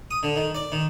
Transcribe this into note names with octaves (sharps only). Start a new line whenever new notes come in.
D#6
D3
D#3
D5
D#3